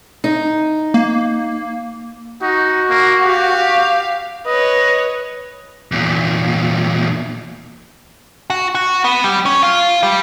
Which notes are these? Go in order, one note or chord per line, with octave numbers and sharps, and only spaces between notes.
D#4
A#3
D#4 F#4
A#3
G4 F5
B4 C#5 D#5
E2 A#2
F#4
F#4
B3
G3
C#4
F4
G3